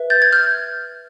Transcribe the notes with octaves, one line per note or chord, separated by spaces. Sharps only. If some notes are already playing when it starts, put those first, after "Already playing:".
Already playing: B4 E5
G6 A6
G#6
F6 G6